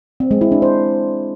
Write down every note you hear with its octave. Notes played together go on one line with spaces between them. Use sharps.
C4
G#3
E4
D4
C5